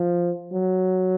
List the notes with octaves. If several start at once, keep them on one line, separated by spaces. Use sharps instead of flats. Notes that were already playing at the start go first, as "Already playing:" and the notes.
Already playing: F3
F#3